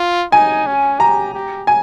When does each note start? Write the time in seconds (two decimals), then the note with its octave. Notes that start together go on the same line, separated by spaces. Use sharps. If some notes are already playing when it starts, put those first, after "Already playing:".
Already playing: F4
0.32 D#4 G#5
0.67 C#4
1.00 G4 A#5
1.34 G4
1.67 G#5